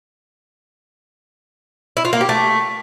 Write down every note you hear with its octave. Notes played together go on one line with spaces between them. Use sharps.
E4
F4
A#3
G4
A3